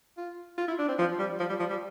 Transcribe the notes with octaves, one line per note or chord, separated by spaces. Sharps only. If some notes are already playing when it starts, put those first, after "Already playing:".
F4
F4
E4
D4
C4
F3
G3
F3
G3
F3
G3